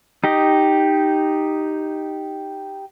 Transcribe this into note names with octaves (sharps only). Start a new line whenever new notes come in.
D#4 G4 D#5